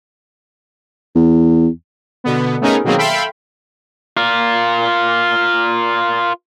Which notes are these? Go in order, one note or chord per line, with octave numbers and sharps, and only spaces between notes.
E2
B2 D3 B3
A3 B3 C#4 D#4 G#4 A#4
B2 D#3 F#3 A#3 C4 G#4
A4 E5 F5 G5 B5 C6
F4 A#4